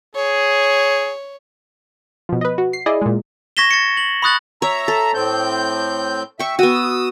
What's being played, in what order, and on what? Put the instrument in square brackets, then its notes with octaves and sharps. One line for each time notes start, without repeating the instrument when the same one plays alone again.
[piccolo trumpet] G#4 [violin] C#5
[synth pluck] B2 F3
B4 D#5
F#4
C7
E4 G#4 D5 D#5
A#2 G#3
[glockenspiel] C#6 G#6 A#6 B6 E7 G7
A6 C#7
F#7
B5 C#6 D#6 F#6 A6 F#7
[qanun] C#5 [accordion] E5 A#5
[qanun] A4
[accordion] A2 C4 G6
[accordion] E5 [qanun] G5 C#6
[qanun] B3 F#4 [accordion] D#6 E6